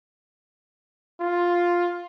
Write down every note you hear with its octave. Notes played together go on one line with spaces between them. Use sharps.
F4